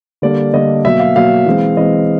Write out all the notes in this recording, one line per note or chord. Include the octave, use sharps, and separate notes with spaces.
D3 G3 A#3 D4 D5
D3 G3 A#3 D4 D#5
B2 F#3 A#3 E5
F5
B2 F#3 A#3 F5
E3 G#3 C4
E3 G#3 C4 D#5